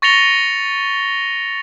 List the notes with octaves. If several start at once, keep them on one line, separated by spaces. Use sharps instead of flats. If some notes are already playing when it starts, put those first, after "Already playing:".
C#6 A6 A#6 C#7 F7 G7